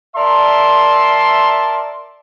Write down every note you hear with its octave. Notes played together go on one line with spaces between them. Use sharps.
A#4 D5 E5 A5 C6